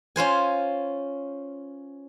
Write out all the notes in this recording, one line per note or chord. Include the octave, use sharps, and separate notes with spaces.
C#4 F4 C5 G#5